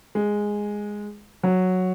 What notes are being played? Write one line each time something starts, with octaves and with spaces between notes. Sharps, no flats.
G#3
F#3